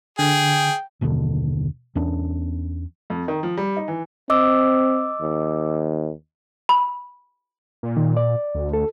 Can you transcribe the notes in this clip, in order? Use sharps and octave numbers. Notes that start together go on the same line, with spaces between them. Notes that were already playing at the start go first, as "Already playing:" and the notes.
D3 G#4 G5
F#1 D#2 B2 D3
E2 B3 C#4 D4
F2
D#3
F3
G3
D#4
E3
C4 D#5 D6 E6
D#2
B5
A#2
D#3
D5
D2
A4